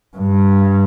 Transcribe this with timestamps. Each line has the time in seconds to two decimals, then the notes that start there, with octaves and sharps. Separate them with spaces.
0.18 G2